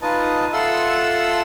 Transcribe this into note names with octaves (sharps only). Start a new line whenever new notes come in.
D#4 F4 B4 D#5 A5
F4 A4 E5 F#5 C6 E6